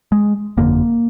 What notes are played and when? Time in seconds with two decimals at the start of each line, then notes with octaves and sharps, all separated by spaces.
0.12 G#3
0.57 G1 F2 D3 A#3